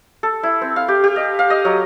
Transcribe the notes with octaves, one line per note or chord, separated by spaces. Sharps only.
A4
E4
C4
F5
G4
G4
D#5
F5
D#5
F#3